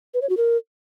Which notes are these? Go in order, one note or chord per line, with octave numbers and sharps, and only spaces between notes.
B4
C#5
F#4
A#4